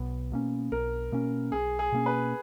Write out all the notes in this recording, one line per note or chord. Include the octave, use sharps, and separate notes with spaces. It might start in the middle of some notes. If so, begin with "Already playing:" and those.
Already playing: B1 B3
B2 A#3 C#4
B1 A#4
B2 A#3 C#4
B1 G#4
G#4
B2 A#3 C#4
B4